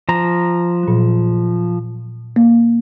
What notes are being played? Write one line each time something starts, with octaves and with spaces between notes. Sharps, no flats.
F3 A#5
A#2 F#3
A#3